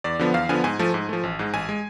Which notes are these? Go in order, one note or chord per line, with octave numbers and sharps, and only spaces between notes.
E2 D5
D3 F3 B3
E2 F5
D3 F3 B3 G#5
G#2 G#5
F3 A3
G#2
F3 A3
A1
G#2 G#3
A1 G#5
G#3